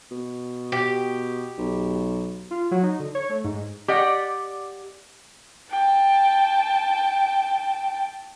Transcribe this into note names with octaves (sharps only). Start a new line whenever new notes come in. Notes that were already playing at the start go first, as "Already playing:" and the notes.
B2
G4
B1
F4
F#3
D#4
D3
C#5
A3
G#2
G4 D5 D#5 F#5
G5 A5